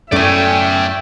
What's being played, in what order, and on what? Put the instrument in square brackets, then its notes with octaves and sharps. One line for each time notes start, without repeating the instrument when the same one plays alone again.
[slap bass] F#2 C#4 [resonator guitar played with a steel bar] A2 A3 [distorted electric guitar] D5 G#5 [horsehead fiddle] E5 G5